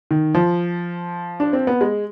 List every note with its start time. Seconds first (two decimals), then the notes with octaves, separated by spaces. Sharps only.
0.11 D#3
0.34 F3
1.40 D4
1.53 C4
1.67 B3
1.81 G#3